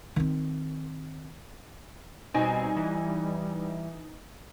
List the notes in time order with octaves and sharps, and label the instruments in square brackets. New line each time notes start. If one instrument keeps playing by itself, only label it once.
[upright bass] D#3 C4
[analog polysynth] B2 C4 [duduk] G3 [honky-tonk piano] D#4 D#5 G#5
[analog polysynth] E3